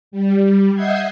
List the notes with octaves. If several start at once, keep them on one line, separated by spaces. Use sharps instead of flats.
G3
D#5 E5 F#5 G6 G#6 C7